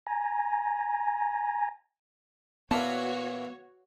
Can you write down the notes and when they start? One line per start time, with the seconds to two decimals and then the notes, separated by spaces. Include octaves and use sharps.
0.06 G#5 A#5
2.71 A#2 E3 B3 F#4 A#4 C#5 A5